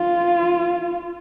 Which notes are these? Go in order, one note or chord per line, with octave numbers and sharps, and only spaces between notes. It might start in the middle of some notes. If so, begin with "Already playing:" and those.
Already playing: F4